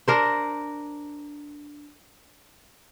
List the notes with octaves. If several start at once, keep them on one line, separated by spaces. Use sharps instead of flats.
D4 A#4 C5